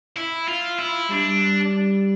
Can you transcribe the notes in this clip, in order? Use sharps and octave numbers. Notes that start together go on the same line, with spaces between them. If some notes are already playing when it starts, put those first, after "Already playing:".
E4
F4
E4
G3 D4